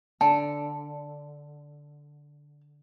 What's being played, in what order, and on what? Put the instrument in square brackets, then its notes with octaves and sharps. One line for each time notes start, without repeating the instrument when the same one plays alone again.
[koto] D3 [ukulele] A5